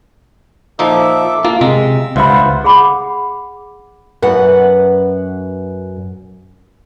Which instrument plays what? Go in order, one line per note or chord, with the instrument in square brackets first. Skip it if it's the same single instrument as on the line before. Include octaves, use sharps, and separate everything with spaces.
[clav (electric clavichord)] A#2 F3 D#4 [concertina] A4 E5 D6
[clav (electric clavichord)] A#3 [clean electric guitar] F4
[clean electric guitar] C3 [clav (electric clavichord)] G#3 [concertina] E6
[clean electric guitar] C#2 E5 B5 [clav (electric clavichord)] G2 [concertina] F4 C5 F#5
[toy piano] G#4 F#5 B5 D6
[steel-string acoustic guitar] F#2 B4 F#5